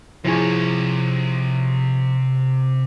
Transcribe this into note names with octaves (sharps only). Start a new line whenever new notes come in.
C3 F3 E4 G#4 C#5